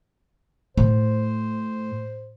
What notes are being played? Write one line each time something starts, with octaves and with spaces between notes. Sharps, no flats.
A2 C5